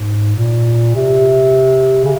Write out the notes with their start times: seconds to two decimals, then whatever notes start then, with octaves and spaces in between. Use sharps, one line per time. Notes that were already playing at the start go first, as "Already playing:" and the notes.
Already playing: G#2
0.36 A#2
0.95 C3
2.04 C#3